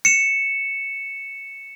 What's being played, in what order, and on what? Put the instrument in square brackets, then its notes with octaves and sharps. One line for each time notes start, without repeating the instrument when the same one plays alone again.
[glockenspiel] C#7 E7